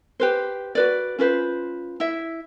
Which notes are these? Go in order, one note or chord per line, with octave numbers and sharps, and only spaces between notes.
G4 B4 C5
F#4 B4 D5
C#4 F4 B4 C5
E4 E5